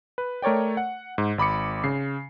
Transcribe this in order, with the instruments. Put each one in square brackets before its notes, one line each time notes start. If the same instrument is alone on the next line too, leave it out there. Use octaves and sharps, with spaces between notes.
[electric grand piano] B4
A3 A#4 C#5 D5 G5
F#5
G#2
G#1 B5 D6 C#7
C#3 C7